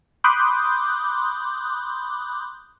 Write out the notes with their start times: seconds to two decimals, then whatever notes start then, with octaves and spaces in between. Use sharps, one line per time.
0.24 B5 C6 D6 D#6 F#6 G6